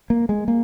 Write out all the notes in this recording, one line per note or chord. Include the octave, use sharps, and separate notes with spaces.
A#3
G#3
A#3